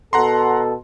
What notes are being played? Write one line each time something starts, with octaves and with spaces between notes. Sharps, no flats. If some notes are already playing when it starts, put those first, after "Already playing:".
B2 A4 F#5 A#5 C6